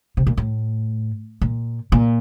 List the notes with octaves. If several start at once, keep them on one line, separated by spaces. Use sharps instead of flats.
C3
A#2
A2
A#2
A#2